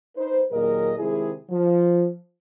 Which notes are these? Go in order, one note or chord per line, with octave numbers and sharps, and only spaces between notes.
D#4 B4 C5
D#2 A#2 F#3 G#4 A#4 D#5
C3 D#3 G#3 E4 G#4
F3